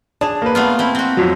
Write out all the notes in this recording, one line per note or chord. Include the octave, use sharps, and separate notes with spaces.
D4 G#4 A5
A#3 B4
A3 B3 F4
C4 E4
C4 F#4
F2 F3 F#3